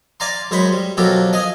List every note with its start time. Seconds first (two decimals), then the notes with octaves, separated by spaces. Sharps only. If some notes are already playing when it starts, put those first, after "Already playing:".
0.20 D5 F5 G#5 A#5 C6
0.51 F#2 G#3 C5 C#5 B5
0.72 G3
0.97 B2 F3 F#3 G4 A4 A#4
1.33 D#5 F5 G#5 D#6